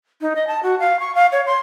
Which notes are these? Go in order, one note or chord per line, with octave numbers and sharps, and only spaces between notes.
D#4
D#5
A5
F#4
F5
C#6
F5
C#5
C6